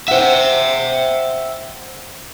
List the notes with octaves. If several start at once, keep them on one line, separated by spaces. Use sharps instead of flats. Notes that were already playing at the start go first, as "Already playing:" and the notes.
C5 E5 F#5 G5